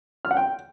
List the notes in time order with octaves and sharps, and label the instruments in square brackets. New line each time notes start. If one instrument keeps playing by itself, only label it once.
[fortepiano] F6
F#5
G5